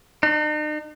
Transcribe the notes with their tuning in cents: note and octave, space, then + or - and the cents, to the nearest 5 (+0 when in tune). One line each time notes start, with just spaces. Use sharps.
D#4 -45